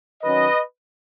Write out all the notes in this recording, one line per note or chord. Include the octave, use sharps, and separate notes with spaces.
D#3 F#3 C#4 B4 D#5